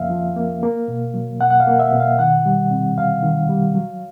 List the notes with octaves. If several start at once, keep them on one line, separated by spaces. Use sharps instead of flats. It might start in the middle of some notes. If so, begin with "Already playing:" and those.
Already playing: F2 C#3 F3 A#3 E5 F5
F3
A#3
A#3
B2
F#3
B2 F#5
F#5
F5
A#3
E5
B2
F5
D#3 F#5
G3
C3
E2 F5
D#3
G3
F#3